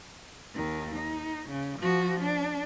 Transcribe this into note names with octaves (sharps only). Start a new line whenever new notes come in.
D#2 D#3
D#4
C#3
F3 F#4
D4